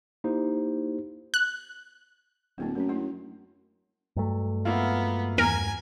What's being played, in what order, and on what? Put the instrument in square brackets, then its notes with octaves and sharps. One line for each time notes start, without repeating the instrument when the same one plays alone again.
[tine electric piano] A#3 D#4 E4 G4 C5
[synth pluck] F#6
[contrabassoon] D1 [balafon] A3 A#3 C4
[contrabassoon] F#2 [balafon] A3 C#4
[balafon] A3 D4 E4
[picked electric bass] G2 F#3 A3
[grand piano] A#3 E4 F4 [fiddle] B3
[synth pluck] E2 A#4 [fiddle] G#5